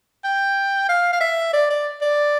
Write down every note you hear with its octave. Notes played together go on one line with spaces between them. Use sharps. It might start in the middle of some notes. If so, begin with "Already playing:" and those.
G5
F5
F5
E5
D5
D5
D5